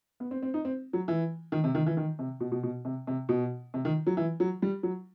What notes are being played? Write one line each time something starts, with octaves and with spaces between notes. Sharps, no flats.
B3
C4
C4
D#4
C4
F#3
E3
D#3
C3
D#3
E3
D#3
C3
B2
B2
B2
C3
C3
B2
C3
D#3
F#3
E3
F#3
G3
F#3